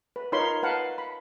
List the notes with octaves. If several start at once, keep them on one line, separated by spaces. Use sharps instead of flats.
B4
D#4 F4 A#4 C#5 B5 C6
B4 F5 F#5 A5
B5